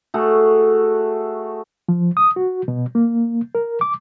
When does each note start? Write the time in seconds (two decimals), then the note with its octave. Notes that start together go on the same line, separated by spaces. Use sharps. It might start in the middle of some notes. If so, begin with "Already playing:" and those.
0.14 A3 F#4 G#4
1.89 F3
2.17 D#6
2.36 F#4
2.68 B2
2.95 A#3
3.55 A#4
3.81 D6